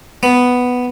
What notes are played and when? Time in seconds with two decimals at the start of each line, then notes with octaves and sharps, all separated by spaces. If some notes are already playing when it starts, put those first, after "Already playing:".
0.23 B3